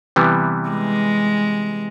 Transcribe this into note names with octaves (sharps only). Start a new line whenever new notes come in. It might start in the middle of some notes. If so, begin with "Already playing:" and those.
C3 E3 G3 B3
G#3